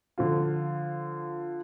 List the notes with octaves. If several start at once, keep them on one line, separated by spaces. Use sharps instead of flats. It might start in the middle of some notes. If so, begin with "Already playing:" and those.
D3 F3 F4